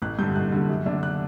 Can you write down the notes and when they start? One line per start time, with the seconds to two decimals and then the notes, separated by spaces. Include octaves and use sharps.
0.02 A1 F#6
0.19 G2 D3 G6
0.36 A1 F#6
0.52 G2 D3
0.69 F#2
0.86 D3 A3 D4
1.03 F#6